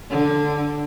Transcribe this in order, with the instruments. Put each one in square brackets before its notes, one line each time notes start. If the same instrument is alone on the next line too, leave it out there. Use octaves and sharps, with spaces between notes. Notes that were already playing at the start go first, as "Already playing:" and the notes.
[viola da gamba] D3